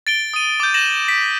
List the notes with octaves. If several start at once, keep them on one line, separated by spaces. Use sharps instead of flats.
A6 D7 G7
D#6 D#7
D6 G6
G6 A#6 E7 F#7
B6 D7